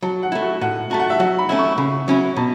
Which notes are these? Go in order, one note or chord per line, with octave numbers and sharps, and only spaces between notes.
F#3 A5
F#5
A3 E4
F#4
A2 F#5
A3 F#4 A5
F#5
E5
F#3 F#5
B5
A3 C#4 E4
C#6
C#3 B5
F#3 C#4 E4
B2 A5